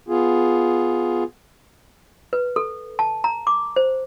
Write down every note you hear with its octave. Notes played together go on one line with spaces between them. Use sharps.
B3 F4 G#4
B4
A4
A5
A#5
D6
C5